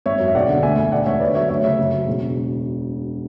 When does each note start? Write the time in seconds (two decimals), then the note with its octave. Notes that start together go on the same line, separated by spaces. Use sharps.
0.06 G#1 C#5 E5
0.19 F#2
0.28 E5
0.34 E1 D5 F#5
0.48 D3
0.63 D2 E5 G#5
0.78 D2
0.92 E1 D5 F#5
1.06 E1 C#5 E5
1.20 D3 B4 D5
1.35 F#3 C#5 E5
1.49 D2 C#5 E5
1.63 C#3 C#5 E5
1.78 F#1
1.92 F#3
2.07 E1